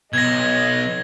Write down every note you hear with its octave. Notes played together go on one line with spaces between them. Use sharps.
B1 D#5 G#6 A#6